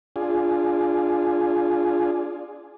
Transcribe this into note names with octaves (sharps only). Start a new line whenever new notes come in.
D4 F4 G#4